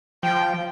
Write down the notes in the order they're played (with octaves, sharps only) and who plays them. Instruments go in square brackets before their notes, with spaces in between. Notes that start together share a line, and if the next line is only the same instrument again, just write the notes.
[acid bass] F3 [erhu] G5